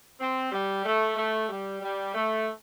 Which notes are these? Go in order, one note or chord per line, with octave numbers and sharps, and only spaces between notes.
C4
G3
A3
A3
G3
G3
A3